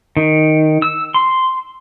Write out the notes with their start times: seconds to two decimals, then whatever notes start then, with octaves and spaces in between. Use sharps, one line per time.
0.17 D#3
0.82 E6
1.14 C6